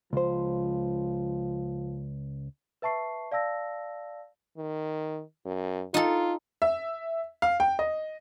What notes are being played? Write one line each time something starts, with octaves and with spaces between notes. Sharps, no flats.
C#2 F3 C5
B4 E5 A5 C#6 C7
D5 F5 A5 E6 A#6
D#3
F#2
D#4 F4 A4
E5
F5
G5
D#5